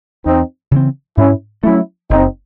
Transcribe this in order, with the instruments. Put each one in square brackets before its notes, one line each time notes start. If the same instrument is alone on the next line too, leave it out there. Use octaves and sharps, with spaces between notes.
[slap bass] E2 [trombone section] C4 D#4
[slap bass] C#3 E3 C4
[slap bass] G#2 [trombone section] C#4 E4
[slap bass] F#3 A3 [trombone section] C#4 E4
[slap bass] F#1 [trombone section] C4 D#4